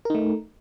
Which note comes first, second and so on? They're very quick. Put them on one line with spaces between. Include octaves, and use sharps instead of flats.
A#4 D#4 A3